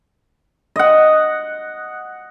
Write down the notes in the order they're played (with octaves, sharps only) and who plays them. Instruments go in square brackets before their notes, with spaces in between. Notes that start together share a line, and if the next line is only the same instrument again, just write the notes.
[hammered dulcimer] D#5 F#5